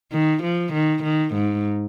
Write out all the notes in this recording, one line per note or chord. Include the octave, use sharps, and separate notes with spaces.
D#3
F3
D#3
D#3
G#2